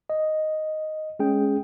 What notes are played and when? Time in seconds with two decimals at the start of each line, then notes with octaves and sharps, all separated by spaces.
0.10 D#5
1.19 G#3 C#4 G#4 G5